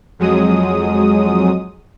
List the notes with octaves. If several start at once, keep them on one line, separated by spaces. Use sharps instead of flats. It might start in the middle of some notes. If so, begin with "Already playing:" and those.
F2 F#3 G#3 D#6